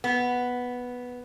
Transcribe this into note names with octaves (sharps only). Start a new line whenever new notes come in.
B3